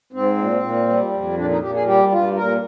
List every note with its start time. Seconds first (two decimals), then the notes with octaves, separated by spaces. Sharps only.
0.13 G#2 C4
0.37 A#2
0.62 A#2
0.88 G3
1.12 F2
1.37 A#2 D4
1.50 D#4
1.62 A#2 G4
1.75 G#4
1.86 G3 G4
2.11 G2 F4
2.36 A#2 A#4